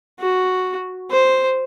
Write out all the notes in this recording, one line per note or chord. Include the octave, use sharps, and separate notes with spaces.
F#4
C5